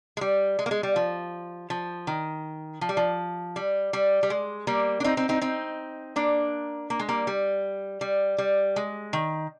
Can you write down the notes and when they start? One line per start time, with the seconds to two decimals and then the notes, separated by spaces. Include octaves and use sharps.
0.17 G#3
0.21 G3
0.59 G#3
0.66 A#3
0.71 G#3
0.83 G3
0.96 F3
1.70 F3
2.07 D#3
2.81 F3
2.89 G3
2.97 F3
3.56 G3
3.93 G3
4.23 G3
4.30 G#3
4.67 G3 A#3
5.00 D4
5.04 C4 D#4
5.17 C4 D#4
5.29 C4 D#4
5.41 C4 D#4
6.16 A#3 D4
6.90 A#3
6.99 G#3
7.09 G3 A#3
7.27 G3
8.01 G3
8.38 G3
8.76 G#3
9.13 D#3